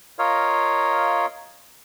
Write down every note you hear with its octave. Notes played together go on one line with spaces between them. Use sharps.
F4 A#4 C#5 D#5 F5